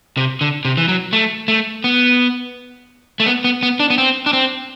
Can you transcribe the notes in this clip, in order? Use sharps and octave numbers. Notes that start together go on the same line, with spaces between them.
C3
D3
C3
E3
F#3
A3
A3
B3
A3
B3
B3
B3
D4
B3
C4
D4
C4